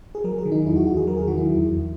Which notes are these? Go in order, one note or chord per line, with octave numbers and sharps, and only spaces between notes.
G#4
F#3 A#4
G#4
D#3
D#4
E2 E4
F#4
E2 F#4
G#4
F#3 A#4
G#4
D#3 F#4
E4
E2
E2